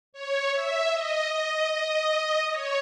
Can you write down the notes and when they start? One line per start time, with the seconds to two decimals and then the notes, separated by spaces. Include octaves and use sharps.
0.13 C#5
0.52 E5
0.92 D#5
1.31 D#5
1.71 D#5
2.50 C#5